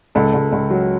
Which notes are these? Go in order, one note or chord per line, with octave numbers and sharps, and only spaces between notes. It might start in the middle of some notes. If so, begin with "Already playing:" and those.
C#2 A4
C#2
C#2
F#3